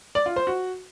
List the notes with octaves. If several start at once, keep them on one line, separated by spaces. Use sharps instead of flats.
D5
F4
C5
F#4